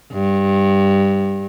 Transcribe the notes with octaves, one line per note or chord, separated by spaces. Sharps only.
G2